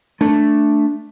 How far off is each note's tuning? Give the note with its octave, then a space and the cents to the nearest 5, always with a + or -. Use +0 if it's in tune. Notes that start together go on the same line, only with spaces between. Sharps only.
A3 +0 D4 +0